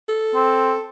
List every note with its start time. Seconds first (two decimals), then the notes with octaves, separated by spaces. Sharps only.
0.08 A4
0.35 C4